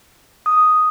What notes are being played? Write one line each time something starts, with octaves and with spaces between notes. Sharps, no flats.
D#6